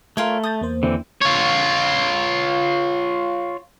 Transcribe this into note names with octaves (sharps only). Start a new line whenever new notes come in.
A3 F4 A#4 C#5
A5 D#6 G6 A6
E2 A#3 C5
D3 E3 C4
F4 C#5